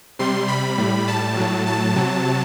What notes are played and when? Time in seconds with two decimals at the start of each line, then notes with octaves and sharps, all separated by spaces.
0.19 C3 G3 C6
0.48 B5
0.78 A2 G3
1.08 A5
1.37 A2 F#3
1.66 A5
1.96 C3 F#3